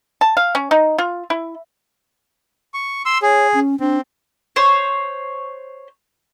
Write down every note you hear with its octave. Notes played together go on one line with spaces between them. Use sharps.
A5
F5
C#4
D#4
F4
E4
C#6
C6 E6
G#4 C#5
C#4
C4 D4
C5 C#5